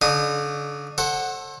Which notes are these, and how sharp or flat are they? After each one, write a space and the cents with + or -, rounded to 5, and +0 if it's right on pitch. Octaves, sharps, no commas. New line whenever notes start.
D3 -40 D4 +40 D#6 +0
A4 +0 C5 +40 F#5 +0